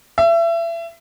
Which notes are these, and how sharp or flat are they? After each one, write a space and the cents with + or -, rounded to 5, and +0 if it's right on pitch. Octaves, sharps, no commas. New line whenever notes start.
E5 +30